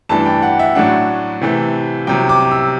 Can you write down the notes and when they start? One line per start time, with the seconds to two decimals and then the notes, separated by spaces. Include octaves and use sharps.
0.09 G2 E3 A3 D4 A5
0.26 G5
0.42 F#5
0.59 E5
0.75 A2 F#3 A3 D4 F#5
1.41 C3 E3 A3
2.07 C2 C3 F#3 G5
2.29 D6
2.51 E6